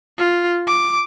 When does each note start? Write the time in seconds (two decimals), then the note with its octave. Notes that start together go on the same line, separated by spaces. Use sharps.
0.19 F4
0.68 D6